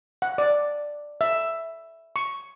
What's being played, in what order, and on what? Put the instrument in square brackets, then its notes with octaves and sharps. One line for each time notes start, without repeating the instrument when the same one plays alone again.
[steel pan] F#5
D5
E5
C#6